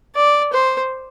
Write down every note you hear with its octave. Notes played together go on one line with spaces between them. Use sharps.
D5
C5